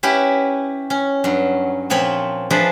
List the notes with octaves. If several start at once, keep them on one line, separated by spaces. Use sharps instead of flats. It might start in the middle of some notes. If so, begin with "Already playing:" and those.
C#4 E4 G4 B4 F#5
C#4
G2 F#3
A#2 F3 C4 C#5 B5
F3 D4 G#4 B4 E5